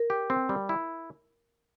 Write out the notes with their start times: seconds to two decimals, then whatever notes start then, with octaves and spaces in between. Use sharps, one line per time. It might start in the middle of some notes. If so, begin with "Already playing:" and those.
Already playing: A#4
0.10 G4
0.30 C4
0.49 G3
0.69 E4